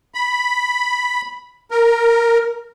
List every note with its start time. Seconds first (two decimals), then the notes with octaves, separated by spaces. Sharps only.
0.15 B5
1.71 A#4